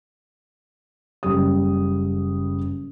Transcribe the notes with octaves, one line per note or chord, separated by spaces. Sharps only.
F#1 G3 D#6